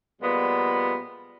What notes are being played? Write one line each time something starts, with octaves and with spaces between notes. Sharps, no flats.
A#2 F3 G3 G#3 B3